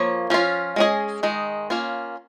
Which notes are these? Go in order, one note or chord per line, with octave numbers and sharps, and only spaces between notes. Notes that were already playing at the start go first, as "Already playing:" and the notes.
Already playing: F3 A#3 C#5
F3 C#4 F4
G#3 C#4 G#4 D#5
D#3 G#3 D#4
A#3 C#4 F4